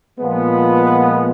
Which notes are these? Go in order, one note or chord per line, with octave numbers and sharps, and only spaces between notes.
A#2 F3 G#3 B3
B4